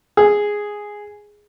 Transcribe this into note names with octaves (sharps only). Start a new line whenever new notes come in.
G#4